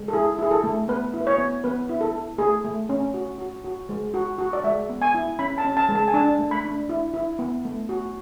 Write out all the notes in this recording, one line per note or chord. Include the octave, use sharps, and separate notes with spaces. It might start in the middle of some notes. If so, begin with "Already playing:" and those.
Already playing: G#3
A4
E4 G#4
E4 G#4
A4
A3
B3 B4
E4
B4
C#5
B3
B3 B4
E4
A4
E4
A3 G#4
A3
C#4
F#4
F#4
F#4
G#3
F#4
F#4
D5
G#3 E5
B3
G#5
E4
C#4 B5
A5
C#4
A5
G#3
A5
G#5
D4 A5
A3
B5
D4
E4
E4
B3
A3
F#4